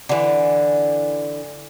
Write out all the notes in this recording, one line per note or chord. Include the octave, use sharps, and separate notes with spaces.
D3 E3